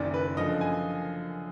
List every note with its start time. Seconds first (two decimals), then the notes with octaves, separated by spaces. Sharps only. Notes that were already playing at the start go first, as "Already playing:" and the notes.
Already playing: F#1 F#2 D#3 D5
0.14 B4
0.37 F#2 D3 F3 D#5
0.61 G#5